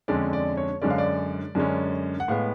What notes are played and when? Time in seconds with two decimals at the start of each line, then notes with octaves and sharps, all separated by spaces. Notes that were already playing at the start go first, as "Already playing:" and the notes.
0.08 F2 D3 G#3 C#4 D5
0.33 D5
0.57 C#5
0.82 F#2 D3 G#3 C#4 D5
0.90 F5
0.98 D5
1.55 F#2 D3 G#3 C#4
2.20 F#5
2.28 A2 G#3 B3 F5